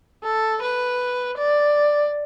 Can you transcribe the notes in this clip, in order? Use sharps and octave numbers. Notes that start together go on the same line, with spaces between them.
A4
B4
D5